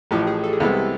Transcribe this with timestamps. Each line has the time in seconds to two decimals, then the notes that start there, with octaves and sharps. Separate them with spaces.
0.11 A1 A2 F3 G4
0.27 G#4
0.44 A4
0.53 G#4
0.60 C2 C3 E3 G#3 B3 A4